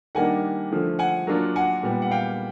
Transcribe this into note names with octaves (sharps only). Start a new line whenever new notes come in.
D#3 G3 A#3 D4 F#5 G#5
D3 F3 A3
F#5 G#5
F#3 A#3 D4 F4
F#5 G#5
A#2 G3 B3
F#5
F5 G5